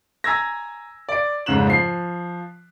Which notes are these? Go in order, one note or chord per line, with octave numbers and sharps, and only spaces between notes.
G#5 A#5 E6 G#6 A#6
D5 D7
F1 G#2 C#3 F#6 E7 F#7
F3 C7